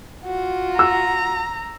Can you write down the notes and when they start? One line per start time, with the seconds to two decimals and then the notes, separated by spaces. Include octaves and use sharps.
0.24 F4 F#4
0.79 A#5 E6